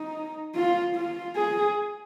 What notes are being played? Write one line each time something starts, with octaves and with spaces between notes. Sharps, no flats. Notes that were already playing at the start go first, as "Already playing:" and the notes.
Already playing: D#4
F4
F4
G#4